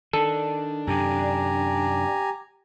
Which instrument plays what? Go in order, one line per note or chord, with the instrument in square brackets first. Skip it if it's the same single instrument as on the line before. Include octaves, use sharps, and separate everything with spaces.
[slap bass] D#3 [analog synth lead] D4 [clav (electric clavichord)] A4
[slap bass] F#2 C3 D#3 [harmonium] G4 G#5 A#5